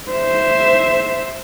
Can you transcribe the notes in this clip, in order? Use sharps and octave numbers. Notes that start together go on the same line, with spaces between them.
C5 E5